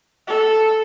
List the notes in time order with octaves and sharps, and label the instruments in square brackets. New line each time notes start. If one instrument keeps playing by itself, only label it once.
[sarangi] A4